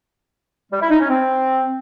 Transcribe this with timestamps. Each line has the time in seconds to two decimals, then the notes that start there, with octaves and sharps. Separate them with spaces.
0.71 G3
0.80 E4
0.90 D#4
0.99 C#4
1.08 C4